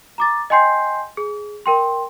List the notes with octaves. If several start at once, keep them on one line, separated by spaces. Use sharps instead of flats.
A#5 D6 A6
D#5 G5 G#5 C6 G6 C7
G#4
A#4 G5 C6